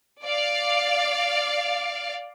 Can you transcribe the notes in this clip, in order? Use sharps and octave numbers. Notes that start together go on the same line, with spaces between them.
D5 F5